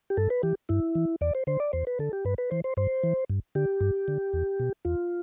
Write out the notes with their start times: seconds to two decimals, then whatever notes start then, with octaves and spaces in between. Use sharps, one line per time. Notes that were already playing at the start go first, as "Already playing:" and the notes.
0.10 G4
0.17 G2 A4
0.30 B4
0.43 E3 G4
0.69 G2 E4
0.95 E3
1.21 E2 D5
1.35 C5
1.47 D3 C5
1.60 D5
1.73 E2 C5
1.87 B4
1.99 D3 A4
2.13 G4
2.25 G2 B4
2.38 B4
2.51 E3 C5
2.64 C5
2.77 G2 C5
3.04 E3
3.30 G2
3.55 D3 G4
3.81 G2
4.08 D3
4.33 E2
4.60 B2
4.85 E2 F4